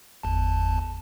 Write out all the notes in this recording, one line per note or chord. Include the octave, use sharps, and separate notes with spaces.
G1 E2 A5